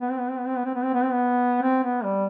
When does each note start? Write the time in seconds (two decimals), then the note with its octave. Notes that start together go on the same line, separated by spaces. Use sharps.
0.01 B3
0.11 C4
0.19 B3
0.29 C4
0.38 B3
0.47 C4
0.56 B3
0.65 C4
0.75 B3
0.84 C4
0.94 B3
1.03 C4
1.12 B3
1.62 C4
1.83 B3
2.04 G3